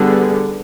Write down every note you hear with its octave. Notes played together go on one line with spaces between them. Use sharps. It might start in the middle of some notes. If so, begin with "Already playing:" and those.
Already playing: D3 G3 B3 G#4